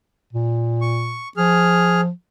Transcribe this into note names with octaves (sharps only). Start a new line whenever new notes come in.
A#2
C#6
F3 G#4 F6